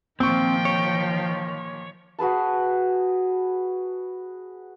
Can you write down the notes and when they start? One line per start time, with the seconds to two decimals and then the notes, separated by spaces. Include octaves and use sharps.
0.20 A#2 D#3 F3 C4 G5 C#6
0.65 C#5
2.19 F#4 G#4 B4 A5